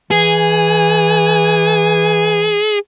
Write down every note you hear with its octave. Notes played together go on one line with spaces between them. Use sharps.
E3 G#4